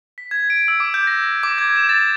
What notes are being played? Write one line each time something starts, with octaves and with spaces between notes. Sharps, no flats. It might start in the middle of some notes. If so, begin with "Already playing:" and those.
B6
G#6
D7
E6
D6
G6
A#6
A#6
D6
G#6
E7
A6